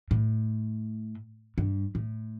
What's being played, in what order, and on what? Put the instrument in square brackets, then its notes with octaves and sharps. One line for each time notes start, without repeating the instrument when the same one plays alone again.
[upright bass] A2
G2
A2